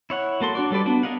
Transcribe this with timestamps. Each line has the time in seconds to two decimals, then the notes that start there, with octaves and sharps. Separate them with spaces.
0.10 E4 C#5 F#5
0.40 F#3 A#3 A4 C6
0.55 D4 F#4 D5
0.71 F#3 G3 A4 B4 D5
0.86 B3 D4 F#4
1.03 G#4 A#4 D#5 F5 F#5